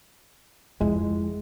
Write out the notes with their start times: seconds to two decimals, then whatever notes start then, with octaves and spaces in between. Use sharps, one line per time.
0.80 F2 D#3 F3 G#3 E4